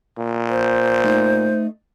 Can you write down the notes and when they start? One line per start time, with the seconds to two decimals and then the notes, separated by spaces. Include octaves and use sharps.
0.18 A#2
0.50 C5
1.04 A3 D#4